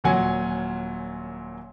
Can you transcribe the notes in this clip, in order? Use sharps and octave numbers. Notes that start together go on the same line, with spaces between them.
D#1 A#2 F#3 F#5 G#5